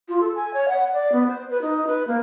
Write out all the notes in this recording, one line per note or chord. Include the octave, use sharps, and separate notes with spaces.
F4
A4
G#5
C#5
F#5
D5
B3
C5
B4
D#4
B4
A#3